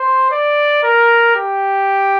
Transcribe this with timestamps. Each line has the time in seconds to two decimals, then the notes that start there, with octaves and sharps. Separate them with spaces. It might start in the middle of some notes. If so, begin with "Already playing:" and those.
Already playing: C5
0.31 D5
0.83 A#4
1.35 G4